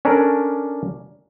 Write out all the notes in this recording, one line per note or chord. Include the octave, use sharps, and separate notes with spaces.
C#4 D4 A4 A#4 C#5 D5